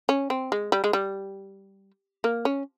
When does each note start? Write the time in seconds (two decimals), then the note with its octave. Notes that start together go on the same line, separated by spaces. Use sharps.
0.09 C#4
0.30 C4
0.52 G#3
0.72 G3
0.84 G#3
0.93 G3
2.24 A#3
2.45 C#4